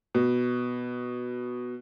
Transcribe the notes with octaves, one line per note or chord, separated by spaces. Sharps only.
B2